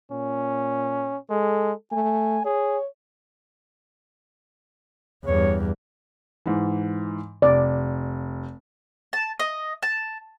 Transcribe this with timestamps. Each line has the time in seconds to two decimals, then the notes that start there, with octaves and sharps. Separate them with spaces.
0.12 A#2 C#4
1.30 G#3 A4
1.92 A3 G#5
2.45 G#4 C#5
5.25 E2 G2 C#5
6.46 G#2 E3
7.42 F1 D5
9.13 A5
9.39 D#5
9.83 A5